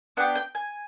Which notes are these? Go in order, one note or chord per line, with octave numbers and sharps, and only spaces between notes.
B3 D4 G4 F#5
G5
G#5